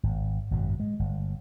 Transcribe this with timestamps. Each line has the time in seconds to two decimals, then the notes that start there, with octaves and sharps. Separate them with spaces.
0.03 G#1
0.51 G#1 F#2 B2
0.80 G#3
0.99 G1